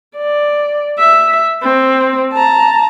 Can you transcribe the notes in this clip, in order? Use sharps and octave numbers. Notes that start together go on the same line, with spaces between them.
D5
E5
C4
A5 A#5